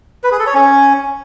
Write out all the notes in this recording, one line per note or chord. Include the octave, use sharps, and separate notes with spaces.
B4
G#4
A4
C#5
C#4